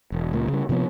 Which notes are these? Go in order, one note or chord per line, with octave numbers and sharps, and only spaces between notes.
E1
C#2 A#2
C#3 G3
C3 F3 G#3 B3